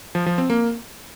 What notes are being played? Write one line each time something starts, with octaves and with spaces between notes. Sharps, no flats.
F3
F3
C4
A#3